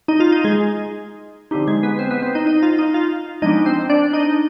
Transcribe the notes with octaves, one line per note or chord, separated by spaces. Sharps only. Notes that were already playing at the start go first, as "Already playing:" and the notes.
D#4 D#5
F4 F5
D#4 D#5
G#3 G#4
D3 F3 C4 D#4 G4
G#3 G#4
B3 B4
C4 C5
B3 B4
C4 C5
D#4 D#5
D#4 D#5
F4 F5
D#4 D#5
F4 F5
F3 G#3 B3 D4 D#4 D#5
C4 C5
D4 D5
D#4 D#5